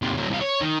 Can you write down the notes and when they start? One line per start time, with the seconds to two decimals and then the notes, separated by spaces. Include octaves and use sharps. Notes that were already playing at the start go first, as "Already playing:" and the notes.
0.02 D#2 C3
0.17 D2 F#3
0.29 C2 F5
0.41 C#5
0.61 D#3